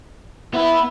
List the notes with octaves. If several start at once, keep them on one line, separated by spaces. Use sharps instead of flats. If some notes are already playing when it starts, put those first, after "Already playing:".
B3 E4 B4